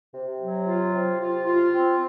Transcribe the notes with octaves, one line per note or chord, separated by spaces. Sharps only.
C3
F#3
F4
C3
F4
F4
C4